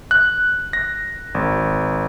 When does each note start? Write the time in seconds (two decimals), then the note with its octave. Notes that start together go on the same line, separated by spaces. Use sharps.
0.11 F#6
0.73 A#6
1.34 G#1